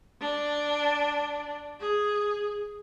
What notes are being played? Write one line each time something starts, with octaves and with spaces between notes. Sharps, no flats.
D4
G#4